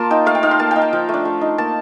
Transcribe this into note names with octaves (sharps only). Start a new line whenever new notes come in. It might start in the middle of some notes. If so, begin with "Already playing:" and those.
Already playing: A#3 F4 A5 C6
D#4 G5
A3 F5
G5
D#4 F5
C6
A#3 A5
D#4 G5
G5
F3 G5
A3
D4
A3
D#4
A#3 A5